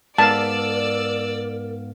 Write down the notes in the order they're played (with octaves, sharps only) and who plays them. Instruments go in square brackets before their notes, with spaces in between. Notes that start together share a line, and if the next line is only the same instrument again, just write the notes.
[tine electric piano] G#2 B3 F5 [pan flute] A#4 [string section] D5 E6 [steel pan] A5